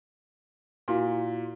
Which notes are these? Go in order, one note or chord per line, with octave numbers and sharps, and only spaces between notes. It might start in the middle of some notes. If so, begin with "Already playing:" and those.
A#2 E4 F#4